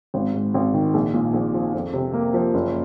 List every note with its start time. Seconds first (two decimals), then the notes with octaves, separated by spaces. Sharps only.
0.14 G#1
0.34 G#2
0.54 G#1
0.73 D#3
0.94 A#1
1.14 A#2
1.34 A#1
1.54 F3
1.74 F2
1.93 C3
2.13 A#3
2.34 F3
2.54 F#1